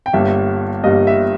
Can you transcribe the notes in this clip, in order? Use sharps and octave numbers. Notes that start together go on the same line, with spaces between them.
G5
G1 G2 G3 A#3 E5
G1 G2 G3 A#3 D#5
E5